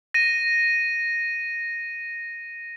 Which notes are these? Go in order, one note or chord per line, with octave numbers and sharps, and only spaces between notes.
A#6 D#7